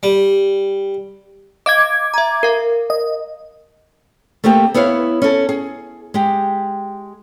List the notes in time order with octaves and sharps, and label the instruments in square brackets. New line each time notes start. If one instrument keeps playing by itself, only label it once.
[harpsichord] G3
[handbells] D#5 F5 [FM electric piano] D6 G#6
[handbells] E5 A#5
A#4 F5
[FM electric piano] D#5
[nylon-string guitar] A3 A#3 C4 G4
B3 E4 B4 C#5 F5
C#4 A4
G#4
G#3 G4